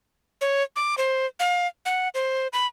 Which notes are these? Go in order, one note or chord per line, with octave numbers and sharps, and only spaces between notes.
C#5
D6
C5
F5
F#5
C5
B5